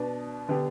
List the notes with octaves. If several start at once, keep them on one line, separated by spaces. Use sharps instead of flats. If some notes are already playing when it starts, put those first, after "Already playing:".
Already playing: B2 B3 D4
D3 B3 D4 G4